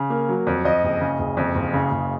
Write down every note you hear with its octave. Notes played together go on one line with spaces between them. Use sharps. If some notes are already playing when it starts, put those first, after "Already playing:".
Already playing: C#3
A#3
F#3
F2
F2 D#5
F#1
C#3
F#1
F2
F#1
C#3
F#1